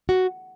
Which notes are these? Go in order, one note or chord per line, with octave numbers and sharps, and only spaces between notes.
F#4